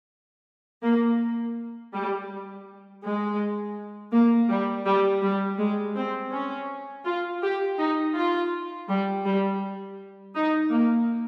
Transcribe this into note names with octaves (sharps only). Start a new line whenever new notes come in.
A#3
G3
G#3
A#3
G3
G3
G3
G#3
C4
C#4
F4
G4
D#4
F4
G3
G3
D#4
A#3